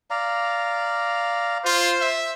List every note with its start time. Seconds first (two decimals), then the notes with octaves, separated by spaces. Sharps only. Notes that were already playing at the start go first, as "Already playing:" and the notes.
0.10 D5 F5 A#5
1.65 F4 C5
2.01 E5